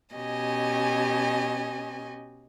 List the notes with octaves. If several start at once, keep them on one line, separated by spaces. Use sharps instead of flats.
B2 C#4 G4 D#5 G#5